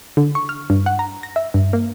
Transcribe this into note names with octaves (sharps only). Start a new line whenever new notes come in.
D3
C#6
F6
G2
F#5
A#5
A#6
E5
G2
A#3